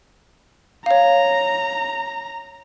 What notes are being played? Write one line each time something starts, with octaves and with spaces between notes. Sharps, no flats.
C#5 F5 A#5